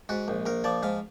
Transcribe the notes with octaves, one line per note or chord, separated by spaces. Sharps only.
G#2 F#4
A#1
A#1 A#4
F3 D5
G#2 F5